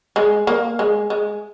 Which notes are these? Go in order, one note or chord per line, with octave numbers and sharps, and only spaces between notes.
G#3
A#3
G#3
G#3